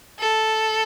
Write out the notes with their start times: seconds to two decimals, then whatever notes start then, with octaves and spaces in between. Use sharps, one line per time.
0.19 A4